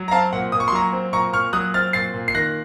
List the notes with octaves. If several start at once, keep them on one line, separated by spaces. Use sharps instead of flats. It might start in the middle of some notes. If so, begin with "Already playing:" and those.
Already playing: F#3
A#5
C4 F5 A5
A#2 F#5
A#2 D#6
C#6
C6
F#3 A#5 C#6
C4
A#2 A#5 C#6
A#2 C#6 F6
F#3 D#6 F#6
C4 F6 A6
A#2 A6 C7
A#2
C7
D#3 F#6 A#6